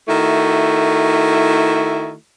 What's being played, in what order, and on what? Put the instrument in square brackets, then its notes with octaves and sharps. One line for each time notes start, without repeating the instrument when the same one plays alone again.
[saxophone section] D#3 A3 E4 F#4